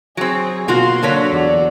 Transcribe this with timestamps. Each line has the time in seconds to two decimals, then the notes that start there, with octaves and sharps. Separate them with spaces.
0.17 F#3 C4 G#4
0.68 B2 A#3 F4 F#4 C6
1.03 D3 F#3 A#3 D4 C#5 B6
1.33 E2 F#4 D5